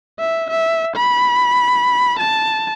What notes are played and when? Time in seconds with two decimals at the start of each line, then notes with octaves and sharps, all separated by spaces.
0.19 E5
0.50 E5
0.96 B5
2.19 A5